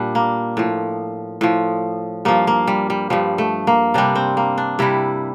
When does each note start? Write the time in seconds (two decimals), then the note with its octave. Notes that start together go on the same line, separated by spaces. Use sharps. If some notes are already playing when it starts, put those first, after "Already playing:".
Already playing: A#2 G3 D4
0.15 A#3
0.57 A2 F3
1.41 A2 F3
2.25 G2 F3 A#3
2.47 A#3
2.67 G3
2.90 G3
3.10 G2 F3 G3
3.38 A3
3.67 A#3
3.94 C3 G3 D4
4.15 C4
4.37 A#3
4.58 D4
4.79 C3 G3 E4